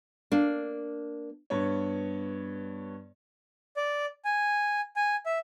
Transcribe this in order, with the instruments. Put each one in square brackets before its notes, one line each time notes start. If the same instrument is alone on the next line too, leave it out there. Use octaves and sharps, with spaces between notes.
[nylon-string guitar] A#3 D4
[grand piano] G2 B3 C#5
[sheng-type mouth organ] D5
G#5
G#5
E5